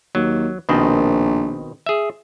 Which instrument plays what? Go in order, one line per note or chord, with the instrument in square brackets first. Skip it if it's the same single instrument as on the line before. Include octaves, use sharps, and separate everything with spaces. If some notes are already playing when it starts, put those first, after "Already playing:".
[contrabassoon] D#2 [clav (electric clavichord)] F#3
[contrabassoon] A#1 [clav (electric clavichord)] B2 D#3 C4
[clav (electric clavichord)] G#4 E5